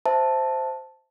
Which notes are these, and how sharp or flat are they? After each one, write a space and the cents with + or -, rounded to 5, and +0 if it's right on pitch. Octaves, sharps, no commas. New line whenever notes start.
C5 -5 E5 +0 A5 +0